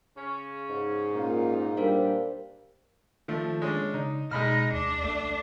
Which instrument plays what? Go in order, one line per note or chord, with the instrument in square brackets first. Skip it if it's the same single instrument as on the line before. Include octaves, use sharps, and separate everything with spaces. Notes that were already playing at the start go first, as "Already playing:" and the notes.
[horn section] C#3 C#4
[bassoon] G#2
[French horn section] A#2 C#4 [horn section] D#4 F4
[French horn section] A#2 G3 D4 [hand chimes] A#4 C5 F5
[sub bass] D#3 [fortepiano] F3 A3
[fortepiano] G#3 C#4 D4
[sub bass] C#3 [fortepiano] D#4
[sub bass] B2 [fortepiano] G#3 B5 F6 [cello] D#4
[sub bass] D#2 [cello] D4
[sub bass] C2 [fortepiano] A3